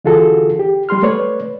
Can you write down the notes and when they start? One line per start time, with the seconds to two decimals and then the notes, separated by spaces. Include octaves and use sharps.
0.05 D3 E3 F4 F#4 G#4 A4
0.59 G4
0.89 G3 G4 C6 F6
1.03 A3 B4 C#5 D5